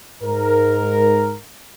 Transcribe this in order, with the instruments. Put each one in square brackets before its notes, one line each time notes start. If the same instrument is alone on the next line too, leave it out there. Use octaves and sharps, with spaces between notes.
[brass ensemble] G#2 A#4